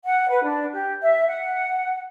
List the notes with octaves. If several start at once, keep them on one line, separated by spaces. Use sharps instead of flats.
F#5
B4
D4
G4
E5
F#5